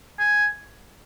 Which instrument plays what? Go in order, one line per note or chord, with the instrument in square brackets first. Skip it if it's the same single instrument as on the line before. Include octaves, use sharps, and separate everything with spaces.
[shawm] G#5